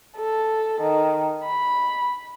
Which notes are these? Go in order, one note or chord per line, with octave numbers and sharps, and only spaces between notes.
A4
D#3
B5